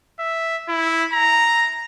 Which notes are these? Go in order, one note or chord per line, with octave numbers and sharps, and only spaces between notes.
E5
E4
A#5